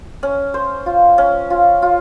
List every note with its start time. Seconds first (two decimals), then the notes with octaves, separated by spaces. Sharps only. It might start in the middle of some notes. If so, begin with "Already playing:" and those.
0.23 C#4
0.54 C5
0.86 F4
1.18 C#4
1.50 F4
1.82 F4